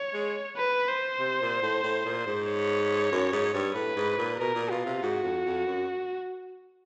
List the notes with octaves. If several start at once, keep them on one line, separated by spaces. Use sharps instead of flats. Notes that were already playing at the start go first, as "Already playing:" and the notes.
Already playing: C#5
G#3
B4
C5
C3
A#2
A2
A2
A#2
G#2
C#5
F#2
G#2
G2
A2 B4
G#2
A#2
B2 A#4
A#2
B2 F4
C3
G#2 F#4
F2
F2
F#2